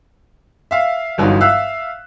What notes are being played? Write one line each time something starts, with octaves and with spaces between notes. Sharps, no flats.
E5 F5
G1 G2 E3 F#3 D#4 F4
E5 F5 E6 F#6